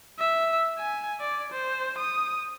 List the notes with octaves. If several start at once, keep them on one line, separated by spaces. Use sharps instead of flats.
E5
G#5
D5
C5
D#6